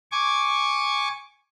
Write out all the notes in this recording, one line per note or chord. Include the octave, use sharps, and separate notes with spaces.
G#5 C#6 D6